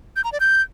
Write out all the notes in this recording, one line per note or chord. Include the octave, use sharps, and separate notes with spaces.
G6
A#5
D5
G6